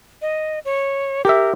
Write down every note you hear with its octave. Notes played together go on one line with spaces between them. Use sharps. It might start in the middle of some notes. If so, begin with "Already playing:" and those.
D#5
C#5
G4 A#4 E5